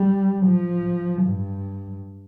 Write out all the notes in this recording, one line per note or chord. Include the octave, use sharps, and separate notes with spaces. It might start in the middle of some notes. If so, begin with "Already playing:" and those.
Already playing: G3
F3
G2